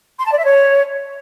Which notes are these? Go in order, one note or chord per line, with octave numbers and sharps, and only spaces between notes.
C6
A5
D5
E5
C#5